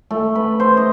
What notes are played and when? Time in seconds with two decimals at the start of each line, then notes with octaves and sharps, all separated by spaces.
0.11 A3
0.35 B4
0.60 C5
0.77 D#5